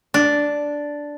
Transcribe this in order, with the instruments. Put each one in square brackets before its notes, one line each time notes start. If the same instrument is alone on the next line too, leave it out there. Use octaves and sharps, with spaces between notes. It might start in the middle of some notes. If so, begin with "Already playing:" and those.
[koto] D4